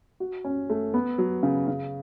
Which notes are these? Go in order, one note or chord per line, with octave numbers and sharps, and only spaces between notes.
F#4
C#4
A3
B3
F#3
C#3
C#3